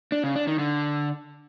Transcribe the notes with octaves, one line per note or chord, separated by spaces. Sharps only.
D4
C#3
D4
D#3
D3